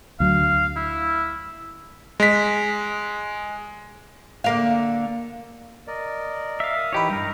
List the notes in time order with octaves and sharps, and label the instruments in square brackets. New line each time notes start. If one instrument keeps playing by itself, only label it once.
[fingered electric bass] D2 F#3 [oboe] F5
[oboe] E4
[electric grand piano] G#3 B6
[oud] D3 A#3 F5
[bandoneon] A#4 D5 D#5
[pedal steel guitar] E5 F5
[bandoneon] D#6
[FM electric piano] E3 D#4 B4 [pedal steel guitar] G4 C#5
[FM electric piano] G2 [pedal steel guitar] D#4 A#4